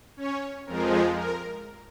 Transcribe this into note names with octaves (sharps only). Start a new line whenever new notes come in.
C#4 C#5
F2 F3 G#3 A#4
A#4